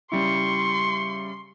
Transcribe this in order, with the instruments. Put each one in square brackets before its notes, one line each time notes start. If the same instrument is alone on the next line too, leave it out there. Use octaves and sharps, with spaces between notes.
[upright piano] C#3 G3 E4 [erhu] C6 [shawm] C#6